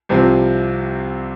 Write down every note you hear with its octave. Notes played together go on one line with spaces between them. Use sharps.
C2 C3 F3 C4